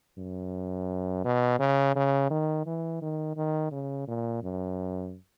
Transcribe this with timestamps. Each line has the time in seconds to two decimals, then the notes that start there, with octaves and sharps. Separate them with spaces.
0.18 F#2
1.24 B2
1.59 C#3
1.95 C#3
2.30 D#3
2.66 E3
3.01 D#3
3.36 D#3
3.71 C#3
4.08 A#2
4.42 F#2